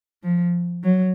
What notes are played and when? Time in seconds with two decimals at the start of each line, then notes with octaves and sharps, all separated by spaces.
0.23 F3
0.84 F#3